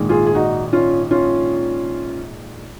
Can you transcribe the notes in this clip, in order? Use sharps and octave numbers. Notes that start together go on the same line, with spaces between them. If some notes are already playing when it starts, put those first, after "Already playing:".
Already playing: A#1 G#2 D#3 G#3
F4 G#4
G#4
D#4 F#4
C#4 F4
C#4 F4